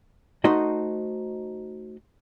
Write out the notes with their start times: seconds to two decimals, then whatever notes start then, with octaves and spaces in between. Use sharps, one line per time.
0.44 A3 D#4 F#4 C5 D#5